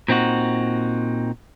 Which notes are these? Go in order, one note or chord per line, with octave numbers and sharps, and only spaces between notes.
A#2 C4 D#4 F#4